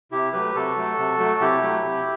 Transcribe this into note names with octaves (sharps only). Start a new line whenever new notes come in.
C3 E4 G4
F#3 A3 G4 B4
C3 F#4 A4
F#3 A3
C3
F#3 A3
C3 E4 G4
F#3 A3
C3